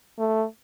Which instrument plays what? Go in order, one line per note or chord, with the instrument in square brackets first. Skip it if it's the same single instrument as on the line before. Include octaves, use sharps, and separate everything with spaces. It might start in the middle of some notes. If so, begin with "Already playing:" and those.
[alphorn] A3